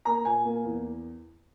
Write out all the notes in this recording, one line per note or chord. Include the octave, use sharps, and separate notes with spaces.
A#3 A#5
A#2 G#5
A#3
E2